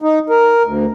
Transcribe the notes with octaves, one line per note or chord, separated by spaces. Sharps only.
D#4
A#4
D2